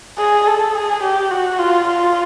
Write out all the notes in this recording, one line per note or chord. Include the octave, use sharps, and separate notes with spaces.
G#4
A4
G#4
G4
F#4
F4
F4